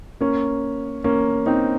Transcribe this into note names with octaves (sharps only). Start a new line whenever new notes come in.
A#3 C#4
A#3 C#4
C4 D#4